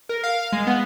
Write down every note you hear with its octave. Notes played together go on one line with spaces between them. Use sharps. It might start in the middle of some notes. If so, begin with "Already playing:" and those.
A#4
F5
G#3
B3